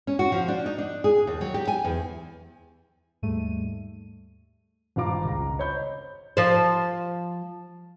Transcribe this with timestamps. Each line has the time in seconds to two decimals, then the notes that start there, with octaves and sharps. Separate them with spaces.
0.07 C#4
0.19 F#4
0.32 F3
0.48 D4
0.66 D#4
0.78 D4
1.04 G#4
1.27 D#2
1.41 F#3
1.54 G4
1.68 G#5
1.84 E2
3.22 D#2 G#2 G3 A3 D#7
4.96 G#1 G2 F4 F5 A#5 D6
5.24 C#2 A#5
5.59 C5 C#5 D#5 B5 G6
6.37 F3 C5